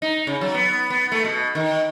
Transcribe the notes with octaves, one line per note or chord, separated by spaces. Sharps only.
D#4
C#3
F#3
B3
B3
A3
B2
D#3